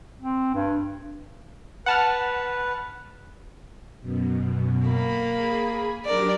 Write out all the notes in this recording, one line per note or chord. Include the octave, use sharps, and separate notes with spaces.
C4
G2
B4 F#5 A5 F6
F#2 B2
A#3 B5
G#4
F#3 D4 G4 A#4 D5